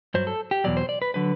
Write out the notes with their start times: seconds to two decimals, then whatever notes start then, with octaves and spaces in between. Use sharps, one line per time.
0.14 G2 F#3 C5
0.27 A4
0.51 G4
0.64 E2 B2 F#3 D5
0.77 C5
0.89 D5
1.02 B4
1.14 D3 F#3 B4